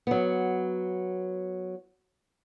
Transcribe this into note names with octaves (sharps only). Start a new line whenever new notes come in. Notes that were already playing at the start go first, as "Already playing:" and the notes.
F#3 B3